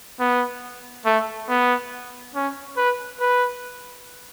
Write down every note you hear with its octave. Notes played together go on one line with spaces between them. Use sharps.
B3
A3
B3
C#4
B4
B4